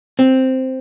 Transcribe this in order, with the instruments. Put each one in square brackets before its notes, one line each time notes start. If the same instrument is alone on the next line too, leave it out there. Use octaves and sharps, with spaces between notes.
[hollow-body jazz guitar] C4